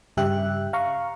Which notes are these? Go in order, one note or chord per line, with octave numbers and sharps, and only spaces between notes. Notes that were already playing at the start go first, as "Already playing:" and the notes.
G2 C#3 G4 E5 G5 F#6
F5 A#5 C#6